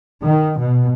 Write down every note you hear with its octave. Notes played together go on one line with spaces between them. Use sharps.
D#3
B2